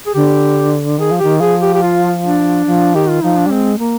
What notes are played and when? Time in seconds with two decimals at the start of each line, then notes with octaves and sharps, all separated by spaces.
0.06 G#4
0.14 D3 G4
0.98 D#3 G#4
1.11 F3
1.19 D#3 G4
1.40 F3 G#4
1.62 G4
1.74 G4
1.82 F4
2.25 D4
2.67 F3
2.95 D#3 G4
3.09 F4
3.23 F3 D#4
3.36 D4
3.46 G3
3.52 G#3 C4
3.79 A#3